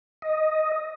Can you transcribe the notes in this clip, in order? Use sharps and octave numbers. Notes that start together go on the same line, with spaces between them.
D#5